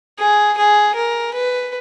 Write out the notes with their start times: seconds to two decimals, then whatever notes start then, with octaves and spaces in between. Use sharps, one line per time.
0.19 G#4
0.58 G#4
0.95 A#4
1.34 B4